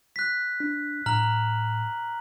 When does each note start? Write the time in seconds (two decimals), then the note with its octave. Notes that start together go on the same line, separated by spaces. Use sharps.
0.16 F#6 B6
0.60 D4
1.06 A2 A#5 F6 F#7